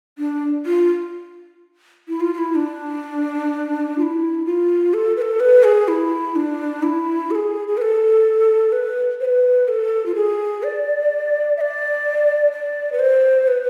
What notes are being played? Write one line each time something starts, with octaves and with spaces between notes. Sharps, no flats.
D4
F4
E4
F4
F4
E4
D4
F4
E4
F4
A4
B4
A4
B4
G#4
E4
D4
E4
A4
G#4
G#4
B4
A4
B4
C5
B4
A4
F4
G#4
D5
E5
D5
D5
B4
C5
B4